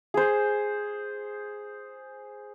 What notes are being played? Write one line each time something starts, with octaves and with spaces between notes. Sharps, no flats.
G#4 C5